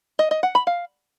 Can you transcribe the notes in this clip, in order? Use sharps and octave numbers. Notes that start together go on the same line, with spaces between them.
D#5
D#5
F#5
B5
F5